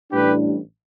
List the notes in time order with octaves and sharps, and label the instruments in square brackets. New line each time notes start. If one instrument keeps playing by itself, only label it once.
[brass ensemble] A1 A2 G3 D4 G4 B4